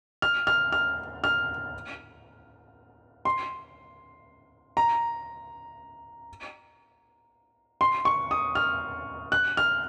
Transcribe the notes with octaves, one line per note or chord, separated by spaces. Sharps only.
F6
F6
F6
F6
C6
A#5
C6
C#6
D#6
F6
F#6
F6